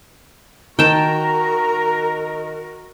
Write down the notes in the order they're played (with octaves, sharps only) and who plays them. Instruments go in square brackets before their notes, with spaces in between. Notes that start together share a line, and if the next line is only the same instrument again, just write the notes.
[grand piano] D#3 [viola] F#4 A#4 [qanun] G5 A5 [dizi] A#5